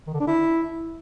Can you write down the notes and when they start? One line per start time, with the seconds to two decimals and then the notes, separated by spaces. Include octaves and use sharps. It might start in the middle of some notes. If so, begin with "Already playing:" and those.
0.07 D#3
0.14 D3
0.20 D4
0.27 E4